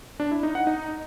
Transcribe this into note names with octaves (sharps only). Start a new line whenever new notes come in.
D4
E4
D#4
F#5
D#4